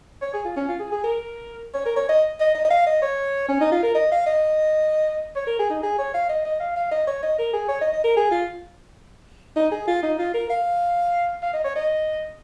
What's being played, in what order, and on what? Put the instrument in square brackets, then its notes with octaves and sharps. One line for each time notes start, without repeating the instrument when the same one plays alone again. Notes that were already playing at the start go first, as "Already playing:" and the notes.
[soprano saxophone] C#5
G#4
F4
C#4
F4
G#4
G#4
A#4
C#5
A#4
C#5
D#5
D#5
D#5
D#5
F5
D#5
C#5
C#4
D#4
F4
A#4
D#5
F5
D#5
C#5
A#4
G#4
D#4
G#4
C#5
F5
D#5
D#5
F5
F5
D#5
C#5
D#5
A#4
G#4
C#5
D#5
D#5
A#4
G#4
F4
D#4
G#4
F4
D#4
F4
A#4
F5
F5
D#5
C#5
D#5